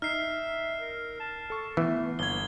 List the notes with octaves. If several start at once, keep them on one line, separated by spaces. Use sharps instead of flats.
D#4 E5 F6 C7
A#4
A5
A4 C#6
E3 A3 B3
G1 A#3 G#6 G7